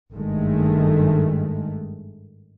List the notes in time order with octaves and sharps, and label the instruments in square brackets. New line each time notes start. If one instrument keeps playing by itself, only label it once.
[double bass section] G#1 G2 D#3 G#3 A3